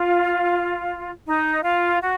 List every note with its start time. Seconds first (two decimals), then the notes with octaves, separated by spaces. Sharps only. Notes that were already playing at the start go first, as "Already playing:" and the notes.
Already playing: F4
1.27 D#4
1.63 F4
2.01 F#4